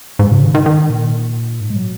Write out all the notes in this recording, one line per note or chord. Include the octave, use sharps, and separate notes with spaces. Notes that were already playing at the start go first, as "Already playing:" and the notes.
G#2
C#3
D#3
D#3
D#3
A#2
G#2
G#3
F#3